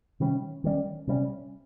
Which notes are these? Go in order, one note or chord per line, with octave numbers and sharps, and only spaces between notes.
C3 D#3 G3 C#4
D#3 G3 C#4
C3 G3 C#4